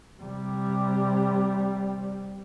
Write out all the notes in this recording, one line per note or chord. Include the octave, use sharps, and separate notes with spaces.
C3 G3